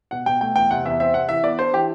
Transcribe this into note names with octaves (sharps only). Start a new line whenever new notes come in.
B2 F#5
B2 G5
A3 G5
E2 G5
C3 F#5
E2 E5
C4 E5
C3 F#5
E3 E5
B3 D5
D4 C5
E3 G4